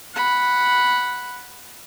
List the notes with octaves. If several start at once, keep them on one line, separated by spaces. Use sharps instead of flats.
F#5 B5